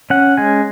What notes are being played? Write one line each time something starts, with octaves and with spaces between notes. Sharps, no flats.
C#4 F#5
G#3 G#5